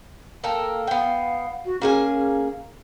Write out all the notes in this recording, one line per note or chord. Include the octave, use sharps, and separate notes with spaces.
A#3 A4 G5
B3 F5 G5
F#4
A#3 C#4 G#4 G#5